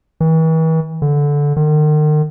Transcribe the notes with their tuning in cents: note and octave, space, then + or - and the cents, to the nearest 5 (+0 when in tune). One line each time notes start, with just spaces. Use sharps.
E3 -40
D3 -15
D#3 -40